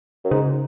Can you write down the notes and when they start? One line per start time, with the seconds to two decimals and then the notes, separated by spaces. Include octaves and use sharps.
0.24 F#2
0.31 G#2 C#3